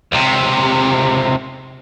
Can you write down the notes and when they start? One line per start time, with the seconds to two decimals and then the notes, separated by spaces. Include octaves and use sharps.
0.12 C#2 C3